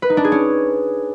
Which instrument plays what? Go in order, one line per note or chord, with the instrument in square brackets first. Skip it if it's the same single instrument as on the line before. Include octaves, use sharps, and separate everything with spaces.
[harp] B4
D#4
D4
G#4
C#4